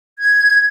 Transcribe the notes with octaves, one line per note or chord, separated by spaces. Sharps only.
G#6